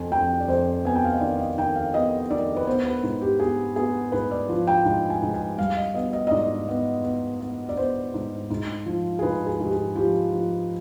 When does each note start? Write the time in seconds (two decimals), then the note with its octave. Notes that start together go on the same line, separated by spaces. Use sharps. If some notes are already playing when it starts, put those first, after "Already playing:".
Already playing: F2 G#5
0.12 F2 G5
0.40 D5
0.48 F2 C5
0.85 B3 G#5
0.95 G5
1.04 F5
1.12 D#5
1.21 D#3 D5
1.32 F5
1.39 D#5
1.57 D#3 G5
1.75 F5
1.94 B3 D#5
2.30 D#3 D5
2.56 B4
2.67 B3 C5
2.85 B4
3.03 G#2
3.22 G4
3.39 B3 G#4
3.76 B3 G#4
4.12 G#2 B4
4.31 D5
4.49 F3
4.67 G5
4.85 G#2
5.10 G#5
5.22 G#2
5.34 G#5
5.58 G3 F5
5.77 D#5
5.95 B3 D#5
6.13 D#5
6.27 D#5
6.31 G#2 D5
6.68 B3
7.04 B3
7.41 B3
7.69 D5
7.77 B3 C5
8.14 G#2
8.50 G#2
8.86 F3
9.19 G#4
9.23 G#2 B4
9.47 G#4
9.60 G#2 G4
9.72 G#4
9.95 F3 G4
10.32 F3